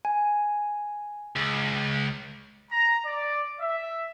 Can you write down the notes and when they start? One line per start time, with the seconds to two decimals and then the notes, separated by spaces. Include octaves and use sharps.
0.05 G#5
1.36 C#2
2.71 A#5
3.06 D5
3.61 E5